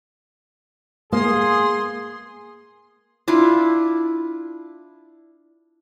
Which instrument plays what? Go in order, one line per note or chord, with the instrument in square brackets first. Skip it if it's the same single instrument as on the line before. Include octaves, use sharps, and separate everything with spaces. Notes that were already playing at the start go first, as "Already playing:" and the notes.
[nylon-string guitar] A#3 [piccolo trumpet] G#4 [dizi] C6 [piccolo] D#6
[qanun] D4 E4 F4